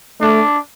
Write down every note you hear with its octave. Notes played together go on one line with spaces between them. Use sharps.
A3 D4